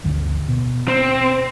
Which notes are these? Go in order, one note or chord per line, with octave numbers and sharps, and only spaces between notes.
G1 D2 D3
B2
C4